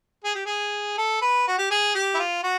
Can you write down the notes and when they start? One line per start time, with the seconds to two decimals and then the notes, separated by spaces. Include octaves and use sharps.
0.24 G#4
0.35 G4
0.46 G#4
0.98 A4
1.22 B4
1.48 F#4
1.59 G4
1.71 G#4
1.95 G4
2.14 E4
2.19 F4
2.43 F#4